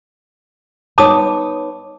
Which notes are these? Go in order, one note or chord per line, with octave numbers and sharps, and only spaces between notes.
B3 D#4 C#5 A5 D6 D#6